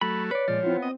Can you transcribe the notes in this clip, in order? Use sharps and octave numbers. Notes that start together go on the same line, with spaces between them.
F#3 A3 B5
B4 C#5 D5
A#2 F3 G#3 D5
B3 C4 E4 F4
C4 D#5